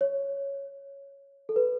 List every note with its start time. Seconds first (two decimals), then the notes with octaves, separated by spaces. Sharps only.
0.01 C#5
1.49 A4
1.56 B4